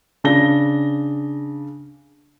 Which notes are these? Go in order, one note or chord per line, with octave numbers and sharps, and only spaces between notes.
C#3 D4 A#6 G7